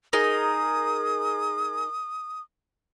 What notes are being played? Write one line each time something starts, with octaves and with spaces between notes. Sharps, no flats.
D#4 G#4 A#4 D#6